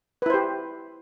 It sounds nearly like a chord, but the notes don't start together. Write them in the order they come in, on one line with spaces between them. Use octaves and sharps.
B4 E4 C5 G4